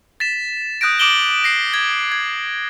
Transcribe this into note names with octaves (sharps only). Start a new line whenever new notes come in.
A6 B6 E7
D#6 F#6 G6 A#6 D7
D6 D#6 D7 E7 F#7 G7
A#6 C7 D7
G#6
G#6